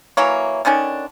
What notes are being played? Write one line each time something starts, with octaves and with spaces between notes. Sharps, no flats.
E3 F#3 A#3 C#5
D3 D#3 C#4 D4